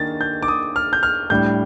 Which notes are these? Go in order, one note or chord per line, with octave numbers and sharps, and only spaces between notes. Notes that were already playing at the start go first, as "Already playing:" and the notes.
Already playing: D#3 A#3 D4 A6
G6
D6
D#6
F6
G6
F6
A2 G3 D4 G6